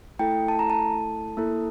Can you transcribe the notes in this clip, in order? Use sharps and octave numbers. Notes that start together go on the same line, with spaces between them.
A3 E4 A4 G5
A5
A#5
A5
A#3 E4 A4